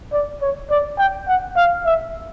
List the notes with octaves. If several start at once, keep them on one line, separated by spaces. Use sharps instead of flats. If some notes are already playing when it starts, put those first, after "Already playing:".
D5
C#5
D5
G5
F#5
F5
E5